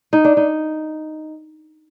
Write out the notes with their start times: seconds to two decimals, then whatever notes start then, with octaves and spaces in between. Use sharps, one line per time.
0.13 D#4
0.25 D4
0.37 D#4